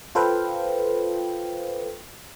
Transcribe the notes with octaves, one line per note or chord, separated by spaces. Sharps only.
F4 A4 B4 C5 F5 G5